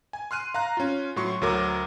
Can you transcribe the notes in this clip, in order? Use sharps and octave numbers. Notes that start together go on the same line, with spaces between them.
G#5
C6 F6 F#6 D#7
F5 A#5 F#6
C#4 F4
A2 F#3 C6 C#6
D2 F#3 A4 A#4 D6